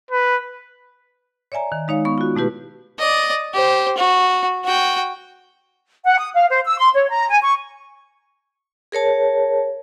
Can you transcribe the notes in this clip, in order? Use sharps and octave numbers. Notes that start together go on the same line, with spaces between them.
B4
C#5 D5 E5 G#5 A#5
D#3
G#3 D#4 C#5 F5
B3 C#6
F4 F#4
B2 A3 E4 G4 B4
D5 D#5
G4 C5
F#4
F#4 G5
F#5
D#6
F5
C5
E6
C6
C#5
A#5
G#5
C#6
G#4 A#4 C#5 A5